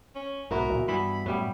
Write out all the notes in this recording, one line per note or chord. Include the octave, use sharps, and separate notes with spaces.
C#4
B1 G#2 B3 E4 F#4 A#4
C#2 A#2 E3
G2 E3 B3 E4 B5
F#2 A2 G3 B3 C#4